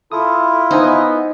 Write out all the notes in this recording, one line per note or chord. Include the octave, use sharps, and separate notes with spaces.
E4 F4 A4 D#6
B3 D#4 C5 D#5 G#5